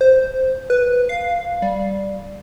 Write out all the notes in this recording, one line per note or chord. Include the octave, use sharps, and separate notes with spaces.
C5
B4
F5
G3